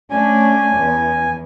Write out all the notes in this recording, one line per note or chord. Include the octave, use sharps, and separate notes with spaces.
A3 C#4 D4 G#5
E2